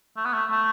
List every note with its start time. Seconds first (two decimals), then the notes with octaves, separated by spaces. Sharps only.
0.17 A3
0.25 B3
0.33 A3
0.51 A3